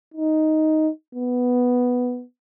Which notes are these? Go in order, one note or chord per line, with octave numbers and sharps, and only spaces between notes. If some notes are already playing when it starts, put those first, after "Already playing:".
D#4
B3